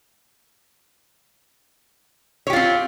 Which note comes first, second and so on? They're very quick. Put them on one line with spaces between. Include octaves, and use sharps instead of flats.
C#5 G4 F4 C4